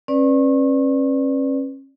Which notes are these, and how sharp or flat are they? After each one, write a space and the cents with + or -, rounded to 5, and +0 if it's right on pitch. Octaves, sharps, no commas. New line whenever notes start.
C#4 -35 B4 +0 D5 +0